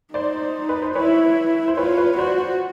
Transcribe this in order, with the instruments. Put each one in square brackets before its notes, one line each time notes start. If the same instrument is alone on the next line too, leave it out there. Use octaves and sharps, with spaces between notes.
[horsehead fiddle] D#4 [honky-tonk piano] C5 D5
[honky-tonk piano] B4
C5
[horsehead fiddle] E4 [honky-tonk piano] B4 C#5
[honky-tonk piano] C5
[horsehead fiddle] F4 [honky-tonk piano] B4 C#5
[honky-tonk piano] B4 C#5
[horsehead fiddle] F#4 [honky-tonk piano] C5 D5